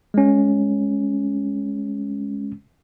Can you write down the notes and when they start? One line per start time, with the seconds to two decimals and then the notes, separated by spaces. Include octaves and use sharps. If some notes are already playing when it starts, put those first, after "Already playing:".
0.14 G#3 C#4